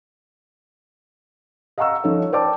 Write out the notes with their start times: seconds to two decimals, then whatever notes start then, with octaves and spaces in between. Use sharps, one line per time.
1.78 D#5 F5 F#5 A#5 C#6 E6
2.04 F3 D#4 A4 C#5
2.32 C5 D5 G5 A5 D6